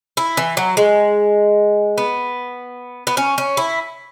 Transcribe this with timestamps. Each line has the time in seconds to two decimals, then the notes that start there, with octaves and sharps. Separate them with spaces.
0.17 E4
0.37 E3
0.57 F#3
0.77 G#3
1.98 B3
3.07 B3
3.17 C#4
3.38 C#4
3.57 E4